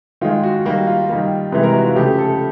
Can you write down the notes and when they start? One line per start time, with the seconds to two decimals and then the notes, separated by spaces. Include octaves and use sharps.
0.21 D#3 G#3 F4
0.43 F#4
0.65 D#3 G3 A#3 F#4
0.87 F4
1.09 D#3 G3 A#3
1.52 C3 E3 G#3 B4
1.63 A#4
1.74 F#4
1.85 F4
1.96 C#3 F3 A3 G4
2.19 A4